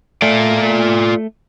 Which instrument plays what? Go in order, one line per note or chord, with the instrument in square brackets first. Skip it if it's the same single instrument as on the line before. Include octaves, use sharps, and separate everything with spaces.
[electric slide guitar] A3 [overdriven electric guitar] F4 D5